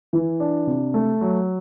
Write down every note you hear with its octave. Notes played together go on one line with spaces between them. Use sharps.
E3
D4
C3
A3
F#3